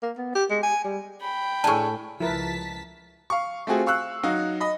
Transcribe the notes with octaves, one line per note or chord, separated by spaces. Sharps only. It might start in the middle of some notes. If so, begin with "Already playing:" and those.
A#3
B3
G4
G#3
G#5
G3
G5 B5
A2 D4 G#4 G#5 A5 C#6
C#2 F3 E4 A#4 B4 A5 B6
F5 C#6
A3 C4 F4 F#4 G#4
F5 C#6 E6 F#6
F#3 D#4 F#4 F5
D#5 B5